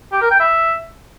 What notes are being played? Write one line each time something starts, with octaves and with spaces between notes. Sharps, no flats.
G4
A#4
G5
E5